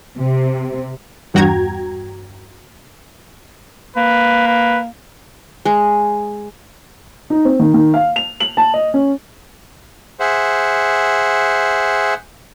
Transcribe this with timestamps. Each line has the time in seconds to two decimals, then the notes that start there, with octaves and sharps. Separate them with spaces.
0.17 C3
1.34 E2 G2 F#4 G5 A#5 G#6
3.97 A#3 B4
4.47 B4
5.65 G#3
7.30 D#4
7.45 C4
7.60 D#3
7.74 D#3
7.94 F5
8.16 F7
8.40 F#7
8.57 A5
8.74 D#5
8.94 C#4
10.20 G#4 C5 E5 F#5